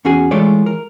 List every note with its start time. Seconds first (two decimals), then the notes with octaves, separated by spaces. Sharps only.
0.05 E2 C#4 F#4 G#4 G#5
0.31 E3 G#3 A3 F4 C#5 D5
0.66 A#4